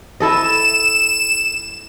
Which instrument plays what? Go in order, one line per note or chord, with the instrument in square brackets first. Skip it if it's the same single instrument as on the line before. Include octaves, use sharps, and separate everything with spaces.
[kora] E4 A4 D#5 [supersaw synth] E7